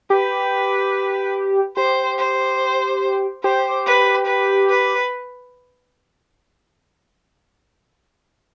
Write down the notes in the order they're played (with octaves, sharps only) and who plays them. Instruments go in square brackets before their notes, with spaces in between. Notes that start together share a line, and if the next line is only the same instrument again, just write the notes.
[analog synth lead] G4 [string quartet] B4
[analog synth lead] G4 [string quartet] C5
[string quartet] C5
[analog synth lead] G4 [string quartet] C5
[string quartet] B4
B4
B4